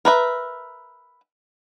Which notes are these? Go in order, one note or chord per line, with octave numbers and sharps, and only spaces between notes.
A#4 B4 E5